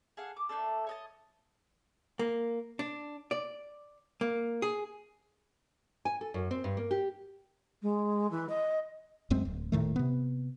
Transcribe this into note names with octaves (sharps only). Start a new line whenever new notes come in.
G#4 A4 F5 F#5
D6
A3 A#3 D4 A4
C#5 D#5 A5
A#3
D4
D5
A#3
G#4
G#5
A4
F#2
C4
G2
A#3
G4
G#3
E3
D#5
D1 F#2 G#3 C4
D1
D#1 A2 D#3 A3
C3 B3